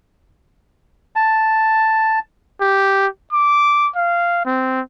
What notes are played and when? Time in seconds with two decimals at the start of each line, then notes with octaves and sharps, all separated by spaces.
1.16 A5
2.61 G4
3.33 D6
3.96 F5
4.45 C4